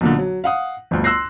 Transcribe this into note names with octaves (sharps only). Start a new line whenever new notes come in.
B1 A#2 D3
F#3
F5 F#5 D#6
G1 D2
C6 E6 F#6 A#6 C7